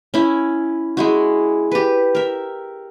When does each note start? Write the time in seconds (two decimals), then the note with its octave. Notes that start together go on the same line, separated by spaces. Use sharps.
0.14 C#4 E4
0.97 G#3 E4 F#4
1.71 G4 B4
2.15 A#4 E5